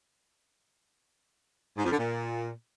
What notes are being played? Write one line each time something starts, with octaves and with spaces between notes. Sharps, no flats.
G#2
F2
D3
A#2